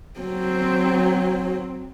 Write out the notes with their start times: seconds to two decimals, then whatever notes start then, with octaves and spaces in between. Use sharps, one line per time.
0.20 F#3 C4